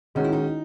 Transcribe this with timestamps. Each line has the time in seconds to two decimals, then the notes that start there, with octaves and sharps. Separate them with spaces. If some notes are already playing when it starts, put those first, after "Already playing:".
0.15 D#3 G#3 C#4 D#4 F#4
0.24 E4
0.33 D#4